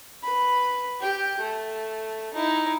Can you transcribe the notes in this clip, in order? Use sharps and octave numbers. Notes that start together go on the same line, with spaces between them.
B4 B5
G4 G5
A3
D#4 E4